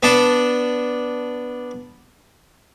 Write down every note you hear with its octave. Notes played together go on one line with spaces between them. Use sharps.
B3 D4 A5